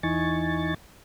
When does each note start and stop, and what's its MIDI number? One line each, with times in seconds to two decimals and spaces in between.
0.03 0.74 40
0.03 0.74 52
0.03 0.74 63
0.03 0.74 80
0.03 0.74 85
0.03 0.74 93